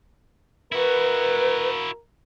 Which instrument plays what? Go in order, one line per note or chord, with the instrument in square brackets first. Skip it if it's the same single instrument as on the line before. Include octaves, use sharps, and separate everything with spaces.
[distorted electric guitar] E4 F#4 [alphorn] A#4 [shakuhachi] B4